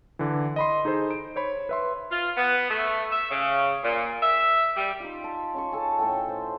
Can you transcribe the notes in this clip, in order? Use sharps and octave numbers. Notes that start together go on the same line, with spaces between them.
D3 E3
D#5 B5 C6
D#4 G#4 A4 C5
D7
C5 C#5 B5
B4 E5 C6
F4
B3
A3
E5
C#3
A#2
E5
G3
D#4 F4
A5
C#4 C6 C#6
A4 G#5 A5
A2 A4 G5
C5